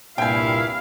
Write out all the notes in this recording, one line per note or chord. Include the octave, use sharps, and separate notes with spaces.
C2 G2 A#2 E4 F5 G5 G#5